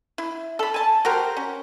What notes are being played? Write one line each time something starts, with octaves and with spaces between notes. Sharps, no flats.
E4
A4 B5
G#5 A5
F#4 G4 A#4 C5
C#4